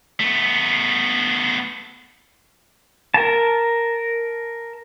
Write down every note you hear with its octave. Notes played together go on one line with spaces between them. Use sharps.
A3 B3
A#4 A5